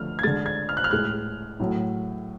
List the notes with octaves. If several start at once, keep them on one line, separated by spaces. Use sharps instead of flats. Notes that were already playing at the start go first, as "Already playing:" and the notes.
Already playing: D3 F3 A3 F6
G#6
D3 G#3 A6
G#6
F6
F#6
F6
A2 G#3 F#6
A2 F#3 A3